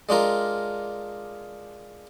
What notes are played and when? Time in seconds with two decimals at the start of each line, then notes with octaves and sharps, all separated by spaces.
0.09 G#3 D4 F4 A#4